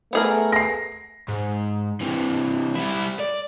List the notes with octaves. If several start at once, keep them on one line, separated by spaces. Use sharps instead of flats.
A3 B3 G#4 A#4
A#6 C7
G#2
C3 E3
G3 E4
D5